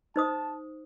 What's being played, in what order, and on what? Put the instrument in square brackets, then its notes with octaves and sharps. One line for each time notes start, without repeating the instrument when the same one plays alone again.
[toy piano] D#4 C5 D#6 [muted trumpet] A5